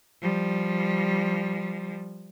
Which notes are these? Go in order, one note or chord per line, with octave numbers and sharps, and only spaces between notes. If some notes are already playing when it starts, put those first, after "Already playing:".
F3 G3